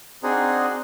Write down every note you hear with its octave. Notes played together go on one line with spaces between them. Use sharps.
C4 D4 D#4 F#4 G#4